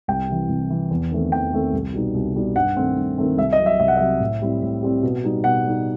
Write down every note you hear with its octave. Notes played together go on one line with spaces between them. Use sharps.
C2 G5
C3 E3
C2
C3 E3
E2
D#3 A3 C4
E2 G5
D#3 A3 C4
C2
B2 G3 D#4
C2
B2 G3 D#4
G2 F#5
D#3 A3 C4
G2
D#3 A3 C4
C2 E5
D#5
C3 F#3
E5
C2 E5
F#5
C3 F#3 E5
A2
G3 C4 E4
A2
G3 C4 E4
B2
G3 D#4
B2 F#5
G3 D#4